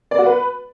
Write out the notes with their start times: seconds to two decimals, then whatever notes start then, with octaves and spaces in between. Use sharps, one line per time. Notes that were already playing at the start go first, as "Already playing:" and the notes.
0.11 D5
0.19 F#4
0.26 B4